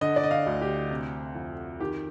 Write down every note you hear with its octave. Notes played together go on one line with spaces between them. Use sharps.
D3 D#5
D5
D#5
F5
D2
G4
C3
F2
D#3 G4